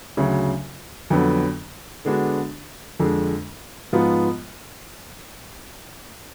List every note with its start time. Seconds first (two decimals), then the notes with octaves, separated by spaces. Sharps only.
0.17 D2 C#3 F#3
1.10 F2 D3 F#3 B3
2.05 D3 G#3 B3 D4 F#4
3.00 F2 D3 G#3
3.93 G#2 F3 B3 F4